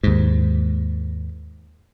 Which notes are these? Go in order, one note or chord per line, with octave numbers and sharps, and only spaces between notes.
D#2 G#2